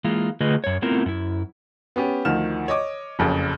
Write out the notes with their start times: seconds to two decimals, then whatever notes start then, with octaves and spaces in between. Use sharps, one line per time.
0.04 E3 G#3 A#3 F4
0.40 D3 A3 F4 G#4 B4 D#5
0.64 F#2 C#5
0.82 A3 B3 C4 E4 F4 A#4
1.06 F#2 E4
1.96 B3 C#4 G4
2.25 D2 D#3 F3 F6 E7
2.68 C#5 D#5 D6
3.19 F#1 F2 C#3